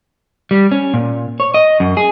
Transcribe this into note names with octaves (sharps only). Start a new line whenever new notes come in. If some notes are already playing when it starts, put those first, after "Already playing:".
G3
C#4
A#2
C#5
D#5
F#2
G#4